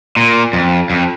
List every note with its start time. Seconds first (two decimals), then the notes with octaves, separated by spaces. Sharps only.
0.17 A#2
0.53 F2
0.90 F2